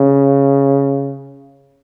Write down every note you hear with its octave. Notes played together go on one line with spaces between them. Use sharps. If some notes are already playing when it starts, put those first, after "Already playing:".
Already playing: C#3